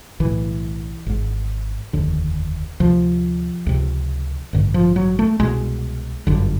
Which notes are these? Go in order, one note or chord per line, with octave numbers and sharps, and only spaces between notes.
B1 A2 E3
G#1 G#2
F1 D#2 D3
D2 C3 F3
C#2 C3
A1 G2 D3
F3
F#3
A3
C2 B2 G#3
G1 F#2 D3